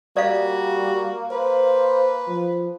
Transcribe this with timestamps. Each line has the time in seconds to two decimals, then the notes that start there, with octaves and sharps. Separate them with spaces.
0.17 G3 A#3 F#4 D5 F5
1.31 B4 C5
2.27 F3